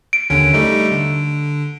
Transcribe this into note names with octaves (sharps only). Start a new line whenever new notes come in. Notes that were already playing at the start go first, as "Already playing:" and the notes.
D7
D#2 D3 C#4
G3 A3 D#4
D3